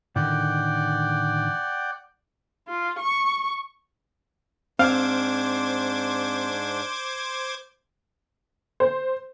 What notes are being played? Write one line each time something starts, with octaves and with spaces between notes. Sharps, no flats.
A2 D3 D#3 D5 F#5 G5
F4
C#6
G#2 C4 D4 C5 F5 D6 G#6
C5